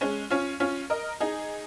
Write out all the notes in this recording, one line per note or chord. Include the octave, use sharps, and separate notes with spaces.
G#3 C#4
C#4 F4
C#4 F4
A#4 D#5
D#4 G#4